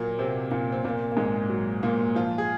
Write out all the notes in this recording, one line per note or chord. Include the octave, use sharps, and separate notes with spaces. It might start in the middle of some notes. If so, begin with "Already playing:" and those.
Already playing: A#2 F#3 A#3
C3 C4
A#2 A#3
C4
A#2 A#3
A#3
G#2 G#3
F#3
A#2 A#3
F3 F4
G#4